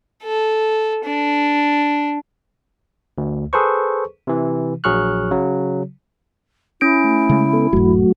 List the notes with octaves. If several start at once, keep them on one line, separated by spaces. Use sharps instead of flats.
A4
D4
D2
G#4 A4 B4 C5 C#6
C3 E3
A#1 F#3 G#4 C#6 F6 F#6
C#3 F#3
C#4 E4 D7
A3
C#3 G#3
B3 A4
E1 G#2 F#3 A3 F#4